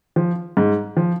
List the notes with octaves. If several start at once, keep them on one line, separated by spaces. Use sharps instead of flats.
F3
G#2
F3